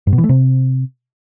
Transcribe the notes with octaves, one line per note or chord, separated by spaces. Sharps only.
G2
B2
E3
A3
C3